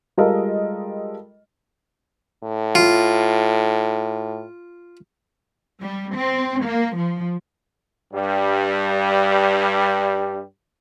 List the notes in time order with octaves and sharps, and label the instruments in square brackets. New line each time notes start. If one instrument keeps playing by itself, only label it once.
[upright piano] G3 G#3 F4 A4 A#4 D#5
[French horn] A2
[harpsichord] F4
[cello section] G3
C4
A#3
F3
[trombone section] G2 G3